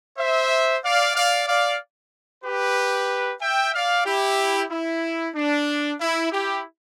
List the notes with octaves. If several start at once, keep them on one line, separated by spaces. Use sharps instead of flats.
C5 E5
D5 F5
D5 F5
D5 F5
G4 B4
E5 G5
D5 F5
E4 G4
E4
D4
E4
E4 G4